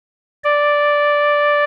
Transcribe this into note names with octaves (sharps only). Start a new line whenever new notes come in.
D5